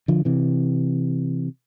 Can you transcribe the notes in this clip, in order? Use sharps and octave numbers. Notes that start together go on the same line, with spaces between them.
D3 F3
C3 E3